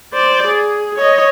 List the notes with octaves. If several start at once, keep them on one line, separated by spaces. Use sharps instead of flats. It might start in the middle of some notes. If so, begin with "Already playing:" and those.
C5 D5
G#4
C#5 D#5